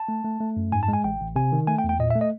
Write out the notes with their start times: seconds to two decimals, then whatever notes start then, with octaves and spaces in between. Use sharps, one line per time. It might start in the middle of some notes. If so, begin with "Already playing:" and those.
Already playing: A5
0.08 A3
0.24 A3
0.40 A3
0.57 F#2
0.72 G#2 G#5
0.83 A5
0.88 G#3
0.93 G#5
1.04 A1 G5
1.20 A1
1.36 C3 G#5
1.52 D#3
1.67 A3 G#5
1.78 G5
1.84 E2
1.89 G5
1.99 A#2 D#5
2.10 E5
2.15 A3
2.21 D#5